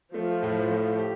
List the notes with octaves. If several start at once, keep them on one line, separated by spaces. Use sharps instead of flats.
F3 A3
A2
A3
G4